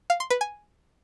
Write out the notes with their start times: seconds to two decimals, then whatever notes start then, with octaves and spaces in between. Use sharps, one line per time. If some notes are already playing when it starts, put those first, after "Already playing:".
0.10 F5
0.20 C6
0.30 B4
0.41 G#5